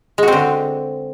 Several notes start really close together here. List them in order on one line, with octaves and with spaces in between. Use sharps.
G#3 F#4 C4 D3